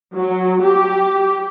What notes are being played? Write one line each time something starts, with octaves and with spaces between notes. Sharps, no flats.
F#3
G4